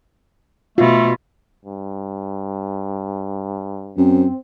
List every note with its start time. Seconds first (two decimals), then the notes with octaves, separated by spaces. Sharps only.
0.78 B2 A3 F4
1.65 G2
3.97 F#2 C4